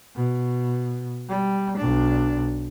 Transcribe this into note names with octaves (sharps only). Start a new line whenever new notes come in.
B2
G3
B1 D4